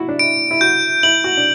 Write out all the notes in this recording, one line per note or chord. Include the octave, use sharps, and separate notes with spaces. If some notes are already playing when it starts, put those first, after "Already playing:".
Already playing: E4 F#4
D4
E4 D7
E4
F#4 G6
E4 F#7
F#4
D4